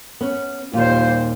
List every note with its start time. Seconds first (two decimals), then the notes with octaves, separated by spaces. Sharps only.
0.21 B3 C#4
0.73 D#2 A#2 G3 F4 C5